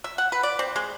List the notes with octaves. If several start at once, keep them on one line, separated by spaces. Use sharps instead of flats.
E5
F#5
B4
D5
C4
G#3